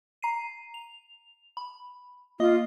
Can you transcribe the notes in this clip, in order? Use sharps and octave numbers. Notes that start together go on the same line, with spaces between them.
A#5 C7 D#7
F7
B5
A#3 F4 D#5 D#6